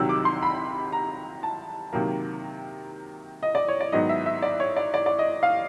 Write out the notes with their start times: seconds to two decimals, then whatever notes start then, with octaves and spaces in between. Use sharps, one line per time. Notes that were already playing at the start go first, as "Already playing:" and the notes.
Already playing: C2 C3 D#3 F#3 E6
0.09 D6
0.25 C6
0.43 B5
0.92 A#5
1.43 A5
1.93 C3 D#3 F#3 A#3
3.43 D#5
3.55 D5
3.68 C#5
3.80 D5
3.92 G#2 D#3 F#3 B3 D#5
4.09 E5
4.26 E5
4.42 D5
4.60 C#5
4.76 D5
4.94 D5
5.06 D5
5.19 D#5
5.43 F5